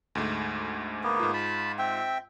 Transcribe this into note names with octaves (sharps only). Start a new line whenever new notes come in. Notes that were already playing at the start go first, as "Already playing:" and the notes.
D2 G#2 A3
A#3 B3
G#2 F4
A5 B5
C4 E5 G5